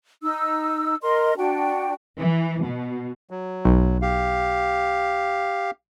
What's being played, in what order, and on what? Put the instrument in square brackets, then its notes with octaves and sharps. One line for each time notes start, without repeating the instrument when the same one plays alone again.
[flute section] D#4 E6
A#4 D#5 C6
D4 F#4 G5
[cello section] E3
B2
[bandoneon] F#3
[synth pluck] B1
[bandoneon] G4 F5